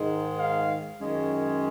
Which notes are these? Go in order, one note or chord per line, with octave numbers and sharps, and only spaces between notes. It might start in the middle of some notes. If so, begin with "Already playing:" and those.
Already playing: G#2 D#3 G#3
F5
F#2 D#3 G#3 C#4